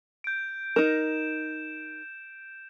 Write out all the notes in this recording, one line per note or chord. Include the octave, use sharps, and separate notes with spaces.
G6 D7
D#4 A#4 E7